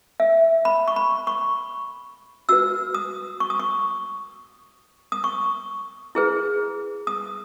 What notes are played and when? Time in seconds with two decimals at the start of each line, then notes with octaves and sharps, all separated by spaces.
0.20 E5
0.65 B5
0.88 C#6
0.96 B5
1.27 C#6
2.49 F#4 B4 E6
2.94 D#6
3.40 C#6
3.50 D#6
3.60 C#6
5.12 D#6
5.24 C#6
6.15 E4 G#4 B4
7.07 D#6